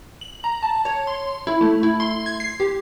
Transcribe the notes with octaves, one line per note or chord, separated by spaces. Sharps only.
F#7
A#5
A5
C#5
C6
E4
A3
E4
C6
G#6
C7
G4